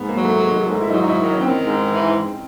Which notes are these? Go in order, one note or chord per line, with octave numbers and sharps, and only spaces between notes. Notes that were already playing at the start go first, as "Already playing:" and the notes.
Already playing: G#2 B3
A#3
F#3
A3
D#3 G#3
G#3
G#2 A3
E4
F#3 D#4
D#4
E4
D#3
D#4
C#4
D#3 C4
G#2
E3